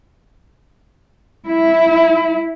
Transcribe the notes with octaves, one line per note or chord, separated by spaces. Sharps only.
E4